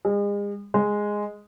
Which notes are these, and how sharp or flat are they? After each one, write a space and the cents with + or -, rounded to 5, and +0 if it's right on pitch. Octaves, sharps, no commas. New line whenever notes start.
G#3 -40
G#3 -5